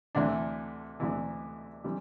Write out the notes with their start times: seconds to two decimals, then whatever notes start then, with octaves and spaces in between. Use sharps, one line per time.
0.15 D2 C3 E3 D4 E4
1.00 D2 C3 E3
1.84 C3 E3 G3